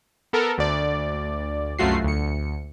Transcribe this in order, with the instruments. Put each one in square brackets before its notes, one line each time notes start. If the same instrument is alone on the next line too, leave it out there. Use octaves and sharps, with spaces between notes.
[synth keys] B3 A4 A#4
D2 D5
C2 F#2 A3 F4 F#4 C7
D2 C#7